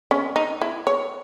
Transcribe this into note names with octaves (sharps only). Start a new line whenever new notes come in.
C#4
D#4
E4
C#5